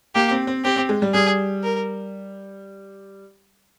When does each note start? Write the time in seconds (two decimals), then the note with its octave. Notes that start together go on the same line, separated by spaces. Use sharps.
0.15 A#3 G4
0.31 C4
0.47 C4
0.64 C4 G4
0.76 C4
0.89 G#3
1.02 G3
1.13 G3 G#4
1.63 A#4